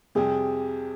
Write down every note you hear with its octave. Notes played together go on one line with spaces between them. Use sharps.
F2 C3 G3 G#4